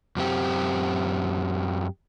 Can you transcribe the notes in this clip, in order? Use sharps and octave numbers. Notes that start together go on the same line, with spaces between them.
F#2 C4 G4